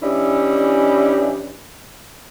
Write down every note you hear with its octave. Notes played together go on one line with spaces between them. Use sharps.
E3 C#4 D4 E4 G4 D#5